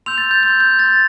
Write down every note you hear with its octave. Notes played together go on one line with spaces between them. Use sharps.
C6 E6 G6 F7
A6
G6
C6 E6 G6
G6
C6 G6 A6